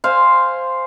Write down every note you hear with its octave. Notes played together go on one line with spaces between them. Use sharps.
C5 F5 G#5